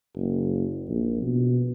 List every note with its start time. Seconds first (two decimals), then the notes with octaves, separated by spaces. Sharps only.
0.16 F#1
0.89 A#1
1.22 B2